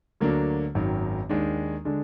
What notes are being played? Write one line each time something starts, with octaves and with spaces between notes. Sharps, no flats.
D2 D3 F#3 A#3 D4
G#1 F#2 D#3 F#3
D#2 D#3 G#3 D4
D3 G#3 D4